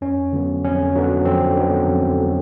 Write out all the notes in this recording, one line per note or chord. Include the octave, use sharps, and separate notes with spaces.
F2 C#4
D3 F#3 B3
F2 C#4
D3 F#3 B3
F2 C4
D3 F#3 B3
F2
D3 F#3 B3